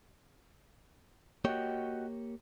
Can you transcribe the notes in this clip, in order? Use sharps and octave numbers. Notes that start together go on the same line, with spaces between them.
A#3 F#4 G4 C#5 D#5 G5